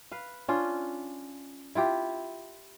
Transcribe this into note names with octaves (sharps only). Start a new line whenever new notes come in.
B4 F5
C#4 D4 F4
E4 F4 G4